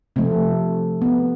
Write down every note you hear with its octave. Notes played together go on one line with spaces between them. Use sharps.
C3 F3 A3 C4
B3